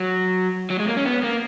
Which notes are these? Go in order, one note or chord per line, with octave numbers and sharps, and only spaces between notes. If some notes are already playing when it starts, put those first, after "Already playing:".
Already playing: F#3
F#3
G#3
A#3
C#4
B3
A#3